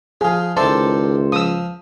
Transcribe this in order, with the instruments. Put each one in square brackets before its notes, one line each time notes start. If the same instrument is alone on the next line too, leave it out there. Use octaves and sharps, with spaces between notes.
[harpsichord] F3 F4 [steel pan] G#4
[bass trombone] C#2 [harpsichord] D#3 E4 D5 [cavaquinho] A4 C5 [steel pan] A5
[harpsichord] F3 [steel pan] D#6 E6